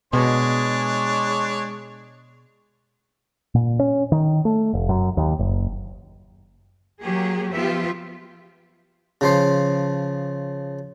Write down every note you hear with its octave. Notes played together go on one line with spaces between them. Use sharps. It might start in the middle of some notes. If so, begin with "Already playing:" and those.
B2 G#3 D4 C#5
A#2
C#4
D#3
A3
F1
F#2
D#2
F#1
F#3 A#3 G4 G#4
F3 B3 F4 G4 E5
C#3 F3 C5